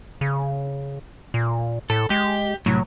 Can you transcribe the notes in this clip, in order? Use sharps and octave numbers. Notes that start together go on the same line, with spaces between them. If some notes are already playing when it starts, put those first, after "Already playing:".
C#3
A#2
A2 A4
G#3 G4
C2 A2 F#3